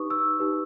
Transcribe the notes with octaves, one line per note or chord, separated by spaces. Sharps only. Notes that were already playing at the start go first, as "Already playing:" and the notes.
Already playing: D#4 G4 B4 C#6 D#6
E6
D#4 G4 B4